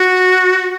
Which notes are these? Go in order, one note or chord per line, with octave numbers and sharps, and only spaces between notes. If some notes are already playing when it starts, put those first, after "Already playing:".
Already playing: F#4